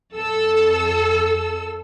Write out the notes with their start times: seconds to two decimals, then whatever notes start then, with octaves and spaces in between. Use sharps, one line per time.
0.13 F2 A4 E6